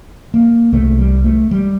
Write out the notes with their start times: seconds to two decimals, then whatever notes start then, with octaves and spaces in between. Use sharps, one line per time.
0.34 A#3
0.72 C2 C3 A3
0.99 G3
1.24 A3
1.51 G3